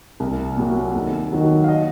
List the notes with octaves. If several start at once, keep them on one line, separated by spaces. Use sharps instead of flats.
C2
A#2 F#3
D#2 A4
D#3 F#3
F5
D#5